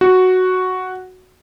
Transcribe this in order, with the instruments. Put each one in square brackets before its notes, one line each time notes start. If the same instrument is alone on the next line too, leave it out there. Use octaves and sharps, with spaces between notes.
[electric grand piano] F#4